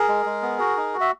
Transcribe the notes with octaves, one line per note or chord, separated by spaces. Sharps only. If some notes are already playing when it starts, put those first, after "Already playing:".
Already playing: G#4 A#4
G#3
G#3
B3
F#4
D#4
F#4
E5